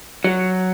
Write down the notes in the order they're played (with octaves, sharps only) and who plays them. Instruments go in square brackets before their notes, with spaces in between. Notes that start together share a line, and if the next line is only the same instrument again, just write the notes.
[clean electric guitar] F#3